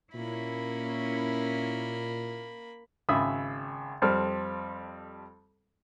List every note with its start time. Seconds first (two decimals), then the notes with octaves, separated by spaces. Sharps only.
0.14 A#2 A#3 C#4 E4 B5
3.09 G#1 C#3 E5 B5 D#6
4.02 F2 G3 C4 A4 F6